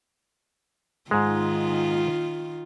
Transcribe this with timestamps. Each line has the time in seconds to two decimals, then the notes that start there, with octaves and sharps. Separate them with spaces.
1.11 G#2 D#3 G#3 F4